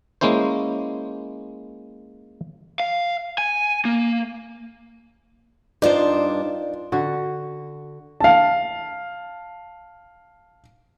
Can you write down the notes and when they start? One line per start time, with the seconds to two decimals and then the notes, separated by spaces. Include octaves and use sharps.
0.21 G#3 A#3 C#4 E4 C5
2.80 F5
3.38 G#5
3.85 A#3
5.82 G2 D4 D#4 F4 C5 D5
6.92 D3 F#4
8.20 F5 A5